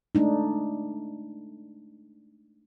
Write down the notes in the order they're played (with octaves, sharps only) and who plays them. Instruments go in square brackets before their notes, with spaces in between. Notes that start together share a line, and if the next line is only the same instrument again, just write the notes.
[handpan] G#3 A3 D4 D#4